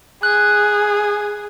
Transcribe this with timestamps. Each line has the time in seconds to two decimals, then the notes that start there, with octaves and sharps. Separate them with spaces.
0.23 G#4 F#6